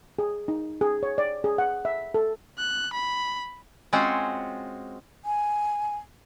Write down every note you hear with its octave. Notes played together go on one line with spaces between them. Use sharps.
G#4
D#4
G#4
C#5
D5
G#4
F#5
E5
A4
F#6
B5
G#3 C4 C#4 F4 F#4
G#5